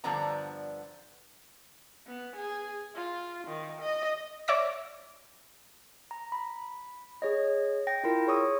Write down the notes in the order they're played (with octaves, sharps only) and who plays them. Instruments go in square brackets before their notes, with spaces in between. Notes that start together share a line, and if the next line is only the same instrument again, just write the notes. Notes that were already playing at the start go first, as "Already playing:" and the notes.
[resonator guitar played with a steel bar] G2 D3 F3 B3 D4 A#5
[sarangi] B3
G#4
F4
D#3
D#5
[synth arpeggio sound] C#5 D5 E5 D6 A#6
[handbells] A#5
B5
G#4 C#5 D#5
G5 A#6
E4 F4 A#4
G#4 C#5 C#6 D#6 E6